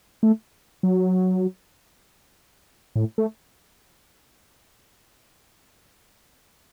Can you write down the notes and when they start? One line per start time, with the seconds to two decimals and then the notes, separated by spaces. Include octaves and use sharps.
0.23 A3
0.83 F#3
2.96 A2
3.18 A3